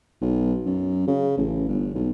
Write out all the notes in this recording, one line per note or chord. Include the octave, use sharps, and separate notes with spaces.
B1
F#2
C#3
A1
G1
B1